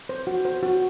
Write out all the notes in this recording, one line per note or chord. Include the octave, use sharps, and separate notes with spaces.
C5
F#4
C5
F#4